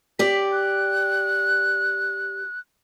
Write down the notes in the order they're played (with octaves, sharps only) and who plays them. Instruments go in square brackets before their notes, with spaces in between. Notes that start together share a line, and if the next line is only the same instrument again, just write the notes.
[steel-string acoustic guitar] G4 D5 [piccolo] B6
[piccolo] F#6